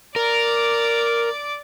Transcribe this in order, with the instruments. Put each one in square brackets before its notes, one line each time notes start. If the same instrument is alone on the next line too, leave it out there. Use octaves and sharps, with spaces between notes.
[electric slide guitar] A#4 [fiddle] D5 D6